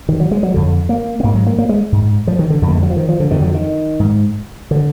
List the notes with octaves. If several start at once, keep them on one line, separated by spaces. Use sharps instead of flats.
D#3
F#3
G#3
F#3
F2 D3
A#3
B3
G#2 A#3
F#3
A#3
A#3
G#3
G#2
F3
D#3
D3
F2 D3
A#3
G#3
F#3
F3
D#3
F3
D3
F2 D3 D#3
F#3
D#3
G#2
D3